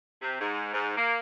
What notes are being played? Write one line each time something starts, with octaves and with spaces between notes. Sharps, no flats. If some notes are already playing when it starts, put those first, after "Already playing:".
C3
G#2
G#2
A#3